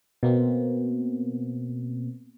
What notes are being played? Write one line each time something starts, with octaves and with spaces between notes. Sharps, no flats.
B2 A#3 C4